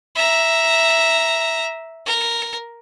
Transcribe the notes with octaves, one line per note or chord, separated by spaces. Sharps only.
E5 A#5
A#4